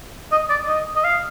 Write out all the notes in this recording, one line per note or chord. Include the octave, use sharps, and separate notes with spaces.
D#5
D5
D#5
D#5
F5